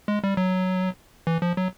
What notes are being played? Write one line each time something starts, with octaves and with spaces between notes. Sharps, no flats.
G#3
G3
F#3
E3
F3
F#3